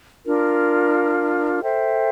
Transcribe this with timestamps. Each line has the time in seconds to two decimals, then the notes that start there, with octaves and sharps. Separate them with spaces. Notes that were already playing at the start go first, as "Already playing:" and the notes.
0.24 D4 F4 A#4
1.62 A4 C5 E5 G5